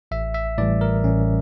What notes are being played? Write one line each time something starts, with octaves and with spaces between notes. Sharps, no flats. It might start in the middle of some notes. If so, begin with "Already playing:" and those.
A1 E5
E5
A2 E3 G3 D5
A#4
A1 C#4